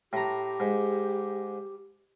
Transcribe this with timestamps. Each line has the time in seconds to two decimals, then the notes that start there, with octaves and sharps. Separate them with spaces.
0.13 A2 G4 A#5
0.60 G#2